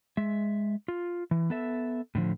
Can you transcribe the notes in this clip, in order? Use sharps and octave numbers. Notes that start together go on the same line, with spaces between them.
G#3 E5
F4
E3
B3 A4 E5
A2 D3 F3